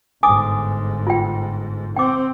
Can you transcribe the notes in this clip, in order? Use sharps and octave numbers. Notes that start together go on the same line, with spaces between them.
G1 G#2 G#5 D6 D#6
F4 G5
C4 G5 D6